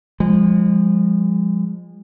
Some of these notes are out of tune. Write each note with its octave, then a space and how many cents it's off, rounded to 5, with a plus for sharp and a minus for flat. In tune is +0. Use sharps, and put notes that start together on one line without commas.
F3 +10 G#3 -30